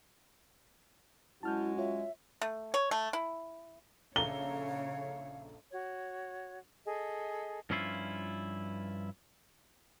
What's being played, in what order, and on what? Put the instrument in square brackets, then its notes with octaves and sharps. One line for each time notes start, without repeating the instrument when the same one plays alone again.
[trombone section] F#2 F#4 [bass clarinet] G#3 [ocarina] E4 [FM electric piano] A5 F6 G6
[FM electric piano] F4 C#5 [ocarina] E5
[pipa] A3
C#5
A3
E4
[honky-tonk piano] A#1 A4 A#5 [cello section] C#3 C#5 [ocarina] F5 [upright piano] G7
[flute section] F#4 C#5
G#4 A4 D#5
[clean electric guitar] G2 F3 C#4 E4 F4